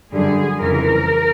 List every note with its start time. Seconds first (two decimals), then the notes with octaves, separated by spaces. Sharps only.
0.11 F#2 D3 G3 G#4
0.61 F2 C#3 E3 A#4